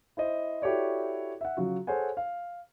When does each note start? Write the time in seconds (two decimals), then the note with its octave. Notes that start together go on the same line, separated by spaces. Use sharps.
0.17 E4 C5 D#5
0.62 E4 F#4 G4 A4 C#5 D5
1.41 E5 F#5
1.57 C#3 F#3 F4 F#4
1.87 G#4 A4 C5 C#5 F#5 G#5
2.17 F5